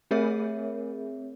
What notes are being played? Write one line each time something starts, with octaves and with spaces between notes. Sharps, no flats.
A3 C4 G#4 A#4 C#5 E5